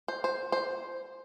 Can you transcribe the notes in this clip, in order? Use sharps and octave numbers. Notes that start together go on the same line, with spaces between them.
C5
C5
C5